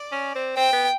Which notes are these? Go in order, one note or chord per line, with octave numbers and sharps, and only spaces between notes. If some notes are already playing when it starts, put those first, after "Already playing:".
Already playing: D5
C#4
C4
C4 G5
B3